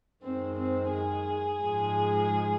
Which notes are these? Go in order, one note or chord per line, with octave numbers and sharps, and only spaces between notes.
F#2 D#3 G#3 C4
C4
G#4
G#2 F3 G#3